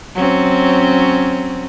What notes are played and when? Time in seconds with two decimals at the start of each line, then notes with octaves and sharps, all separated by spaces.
0.15 F#3 C4 C#4